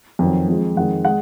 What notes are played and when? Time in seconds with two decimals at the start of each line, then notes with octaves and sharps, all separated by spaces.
0.19 F2 D#3 F#3
0.48 F2 F3 G#3
0.76 F2 D#3 G#3 F#5
1.05 G#3 F#5